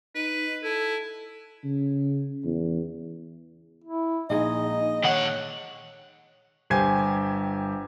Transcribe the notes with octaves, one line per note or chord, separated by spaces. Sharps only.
D#4 B4
E4 A4
C#3
E2
E4
A#1 G#3 D#4 G#4 D#5
D#3 C#5 F#5
G1 G4 C5 G#5 G#6